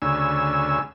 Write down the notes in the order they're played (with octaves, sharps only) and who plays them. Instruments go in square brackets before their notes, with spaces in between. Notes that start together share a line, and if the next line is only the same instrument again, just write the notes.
[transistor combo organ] D2 C#3 G#5 E6